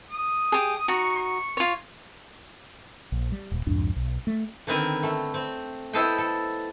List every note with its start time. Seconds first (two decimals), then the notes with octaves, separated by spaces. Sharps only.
0.10 D#6
0.52 G4 G#4
0.88 D#4 F#4 C#6
1.15 C#6
1.57 F4 C#5
3.12 A#1
3.32 G3
3.52 D#1
3.67 C2 F2 G#2 D4
3.96 B1
4.27 A3
4.67 D3 D#3 B3 C4 A#4 G#5
5.03 A3
5.34 C4
5.93 B3 E4 A4 C5 D#5 G5
6.18 A4